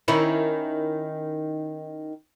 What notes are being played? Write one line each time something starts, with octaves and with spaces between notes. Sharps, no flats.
D#3 C#4 E4